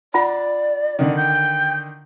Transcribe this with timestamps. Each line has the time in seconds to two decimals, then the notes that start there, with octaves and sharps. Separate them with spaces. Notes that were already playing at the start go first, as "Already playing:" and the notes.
0.14 F4 D5 F#5 B5
0.99 D3 D#3
1.17 G5 G6